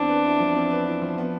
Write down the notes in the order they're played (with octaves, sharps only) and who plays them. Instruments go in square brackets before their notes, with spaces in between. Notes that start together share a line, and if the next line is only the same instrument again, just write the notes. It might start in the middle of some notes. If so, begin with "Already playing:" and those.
Already playing: [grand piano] E2 C4 [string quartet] D4
[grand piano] B4
E4
F3
C4
B4
E4
F3
B3